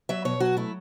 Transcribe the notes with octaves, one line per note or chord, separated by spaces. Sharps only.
F#3 E5
B2 C#5
F#3 F#4
A3 E4